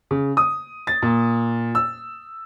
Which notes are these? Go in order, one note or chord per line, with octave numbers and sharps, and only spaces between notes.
C#3
D#6
A6
A#2
E6